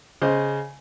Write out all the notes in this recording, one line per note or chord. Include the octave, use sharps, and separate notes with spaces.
C#3 C5 D#5